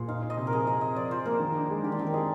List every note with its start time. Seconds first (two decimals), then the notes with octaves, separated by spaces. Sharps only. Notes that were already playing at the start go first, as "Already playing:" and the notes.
Already playing: A#2 G#4 C5
0.08 D#4 F5
0.22 D#4
0.30 D#5
0.37 C3
0.47 A#4
0.52 F3 G#4
0.67 F3 D#5
0.81 C4 D#5
0.96 F3 D5
1.11 F3 C5
1.26 A#3 A#4
1.40 D#3
1.55 D4
1.70 G#3
1.84 D#3 G4
1.92 D4
1.99 D#3 C4
2.07 A#4
2.14 D#4 G#4